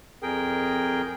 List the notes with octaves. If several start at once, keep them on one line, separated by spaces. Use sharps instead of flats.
F2 G#4 A#4 G5